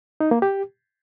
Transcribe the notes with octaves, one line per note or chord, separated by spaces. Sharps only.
D#4
A#3
G4